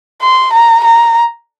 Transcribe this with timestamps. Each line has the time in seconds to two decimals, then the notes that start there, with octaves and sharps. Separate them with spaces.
0.22 C6
0.53 A#5
0.84 A#5